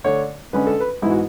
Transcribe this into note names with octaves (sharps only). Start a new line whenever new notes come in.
D3 A3 D4 C#5
D3 G#3 C#4 B4
A4
B4
G#2 E3 G#3 B3 E4
F#4